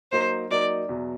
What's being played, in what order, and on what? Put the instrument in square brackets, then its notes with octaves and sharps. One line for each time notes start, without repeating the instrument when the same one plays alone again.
[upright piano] F#3 A#3 D#4 [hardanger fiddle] C5
[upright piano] F#3 A#3 D#4 [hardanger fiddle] D5
[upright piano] E2 B2 F#3